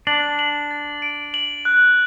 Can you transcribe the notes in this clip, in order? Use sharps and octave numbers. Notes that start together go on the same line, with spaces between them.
D4 F#7
F#7
A6
D7
F#7
F#6